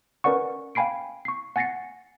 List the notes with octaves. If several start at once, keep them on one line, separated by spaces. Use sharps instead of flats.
C#4 A#4 B4 D5 F#5 C#6
F5 G5 G#5 B5 C7 D7
C#6 C7
F#5 G#5 A6 A#6 C7 C#7